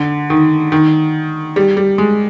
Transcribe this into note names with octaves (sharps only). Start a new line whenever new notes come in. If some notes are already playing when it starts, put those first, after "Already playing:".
Already playing: D3
D#3
D#3
G3
G3
G#3